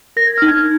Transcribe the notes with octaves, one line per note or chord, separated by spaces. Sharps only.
A#4 A#6
G#6
D#4 F6
G#6